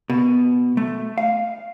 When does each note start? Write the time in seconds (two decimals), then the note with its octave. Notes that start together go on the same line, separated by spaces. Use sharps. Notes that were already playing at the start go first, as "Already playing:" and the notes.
0.10 B2
0.77 A3
1.18 F5